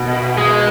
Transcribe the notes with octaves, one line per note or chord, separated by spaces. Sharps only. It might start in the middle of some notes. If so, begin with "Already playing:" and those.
Already playing: B2
G#3